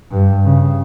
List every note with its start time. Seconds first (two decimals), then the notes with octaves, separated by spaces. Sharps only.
0.12 G2
0.45 C#3